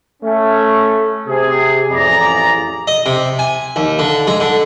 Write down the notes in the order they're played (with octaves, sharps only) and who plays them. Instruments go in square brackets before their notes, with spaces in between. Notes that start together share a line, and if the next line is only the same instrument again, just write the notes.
[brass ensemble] A3 C#4
C3 G#4
A1 F2 G#4 D5 A#5
[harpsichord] D#5
C3
G#5
D#2
D3
G#3
D3